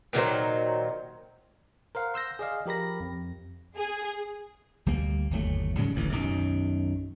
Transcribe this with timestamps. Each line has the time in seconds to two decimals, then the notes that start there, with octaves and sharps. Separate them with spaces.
0.13 A#2 D#3 F#3 C5
1.95 A#4 C5 F5 F#5
2.14 C6 E6 G6 A#6
2.39 G#4 D5 D#5 F5
2.66 F3 G4 A#4 B5 A#6
3.00 F2
3.78 G#4
4.86 D2 G3 A#3
5.31 G1 D#2 F#3 A3
5.77 G#2 C#3 F#3 G3
5.94 D1 A1 D3 E3
6.12 B1 F#2 D#3